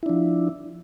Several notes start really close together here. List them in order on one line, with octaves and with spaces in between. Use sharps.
E4 D4 F3